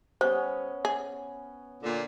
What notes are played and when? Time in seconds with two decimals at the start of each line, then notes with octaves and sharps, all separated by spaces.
0.21 G3 B3 C#4 C5
0.85 G#4
1.83 A#2 D3